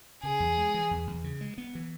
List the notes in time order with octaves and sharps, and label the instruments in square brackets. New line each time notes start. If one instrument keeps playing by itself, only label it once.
[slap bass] C#3 [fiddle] G#4
[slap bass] E2
G#3
E3
E2
E2
C#3
G#3
B3
E3